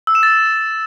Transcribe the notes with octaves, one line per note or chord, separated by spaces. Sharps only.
E6
E7
A6